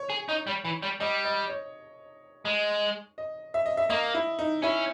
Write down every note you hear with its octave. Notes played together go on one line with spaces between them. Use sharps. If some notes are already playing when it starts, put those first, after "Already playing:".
Already playing: C#5
G#4
D#4
G3
E3
G3
G3 D#5
D#5
C#5
G#3
D#5
E5
D#5
E5
A#3 D#5
E4
D#4
C#4 E4